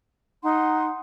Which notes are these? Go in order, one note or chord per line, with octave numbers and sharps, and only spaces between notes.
D#4 F#5 C6